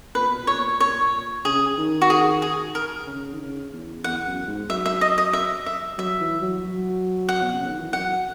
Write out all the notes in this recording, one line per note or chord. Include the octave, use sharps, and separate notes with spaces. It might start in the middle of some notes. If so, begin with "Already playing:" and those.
A#2 B4
B2
A#2 C#5
C#5
C#3 G#4
D#3
F#4
G#4
G#4
A#4
C#3
D#3
C#3
E2
E2 F#5
F#2
G#2
F#3 E5
E5
D#5
D#5
E5
E5
F#3 E5
E3
F#3
F#3
F#5
B2
C#3
D#3
E3
F#3 F#5